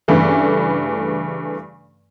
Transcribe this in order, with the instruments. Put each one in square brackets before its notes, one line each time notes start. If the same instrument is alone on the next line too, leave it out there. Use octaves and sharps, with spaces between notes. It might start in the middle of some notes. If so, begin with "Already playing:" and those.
[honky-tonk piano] G2 C#3 E3 A3